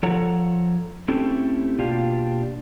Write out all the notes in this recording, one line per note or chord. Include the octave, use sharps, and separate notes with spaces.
F3 A4 C#5 F#5 A#5
A3 C4 C#4 E4 G4 A4
B2 A#3 D4 F4 G4 F5